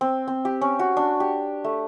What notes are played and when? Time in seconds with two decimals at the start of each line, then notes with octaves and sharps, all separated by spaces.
0.01 C4
0.28 C4
0.45 G4
0.61 C#4
0.79 F#4
0.97 D4
1.20 G4
1.64 A3